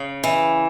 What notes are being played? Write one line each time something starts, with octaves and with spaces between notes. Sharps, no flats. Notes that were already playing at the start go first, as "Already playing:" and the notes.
Already playing: C#3
E3